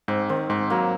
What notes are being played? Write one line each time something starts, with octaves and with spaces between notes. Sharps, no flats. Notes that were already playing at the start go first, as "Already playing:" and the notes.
G#2 C4
D#3 C4
G#2 C4
F#3 A#3